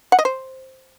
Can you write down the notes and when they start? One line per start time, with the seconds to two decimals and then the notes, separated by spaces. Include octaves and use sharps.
0.12 F#5
0.19 D#5
0.25 C5